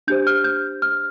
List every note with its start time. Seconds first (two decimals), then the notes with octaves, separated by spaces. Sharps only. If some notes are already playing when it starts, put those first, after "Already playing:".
0.07 D4 G4 C5 G6
0.27 F6
0.44 G6
0.82 F6